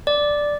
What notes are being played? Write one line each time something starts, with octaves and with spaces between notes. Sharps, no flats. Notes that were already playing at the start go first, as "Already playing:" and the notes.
D5